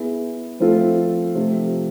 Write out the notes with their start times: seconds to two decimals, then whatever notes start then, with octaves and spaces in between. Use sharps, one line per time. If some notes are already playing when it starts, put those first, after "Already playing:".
Already playing: B3 E4 G#4 B4
0.60 F3 A3 C4 F4 A4
1.35 C3 F3 A3